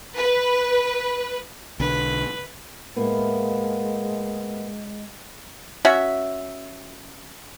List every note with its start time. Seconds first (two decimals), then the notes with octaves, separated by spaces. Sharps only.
0.18 B4
1.80 B1 D3 B4
2.96 A2 G#3 A#3 B3
5.85 C#4 F#4 E5